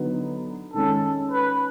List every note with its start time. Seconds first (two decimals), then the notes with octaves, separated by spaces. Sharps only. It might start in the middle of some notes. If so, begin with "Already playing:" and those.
Already playing: D3 F#3 B3 D#4
0.74 D#3 G#3 C#4 A4
1.31 B4